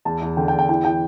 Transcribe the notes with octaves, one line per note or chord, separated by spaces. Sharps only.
E2 A5
E2
D3 G5
G5
E2
G5
E3 G5
E3 G5